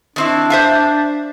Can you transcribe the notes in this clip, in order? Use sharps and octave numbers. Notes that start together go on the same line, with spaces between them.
D#3 C4 D4 E4
C5 E5 F5